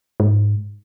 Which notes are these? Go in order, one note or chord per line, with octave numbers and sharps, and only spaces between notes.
G#2